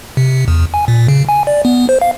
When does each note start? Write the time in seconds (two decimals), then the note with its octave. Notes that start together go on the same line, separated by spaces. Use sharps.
0.17 C3
0.48 E2
0.74 G#5
0.88 A#2
1.08 C#3
1.29 G#5
1.47 D5
1.65 B3
1.89 C5
2.02 F5